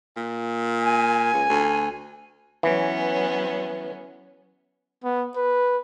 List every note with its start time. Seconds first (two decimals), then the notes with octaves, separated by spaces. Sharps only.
0.16 A#2
0.83 G#5
1.33 C#2
1.50 D2
2.63 E3 F#3 B3 C#4
5.04 B3
5.36 B4